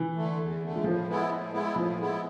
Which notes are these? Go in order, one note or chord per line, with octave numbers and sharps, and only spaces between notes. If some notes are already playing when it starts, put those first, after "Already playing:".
Already playing: E3
D3 A3
E2
D3 A3
G#3
A2 F3
G#3 B3 E4
A2
G#3 B3 E4
A2 F3
G#3 B3 E4